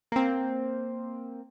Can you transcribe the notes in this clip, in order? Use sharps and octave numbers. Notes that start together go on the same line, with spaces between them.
A#3 C4